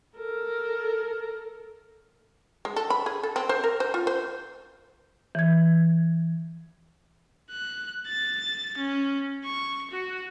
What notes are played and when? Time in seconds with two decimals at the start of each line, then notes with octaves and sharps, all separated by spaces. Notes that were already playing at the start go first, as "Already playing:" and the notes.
0.18 A4 A#4
2.65 G#3
2.76 A4
2.90 B5
3.06 G#4
3.23 A4
3.36 C4
3.49 C5
3.64 A#4
3.80 C5
3.94 F4
4.07 C5
5.35 E3 G#6
7.51 F#6
8.07 A6
8.77 C#4
9.45 C#6
9.91 F#4